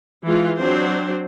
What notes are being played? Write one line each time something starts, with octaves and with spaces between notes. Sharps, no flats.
E3 G#3 F4
F#3 C4 D4 C5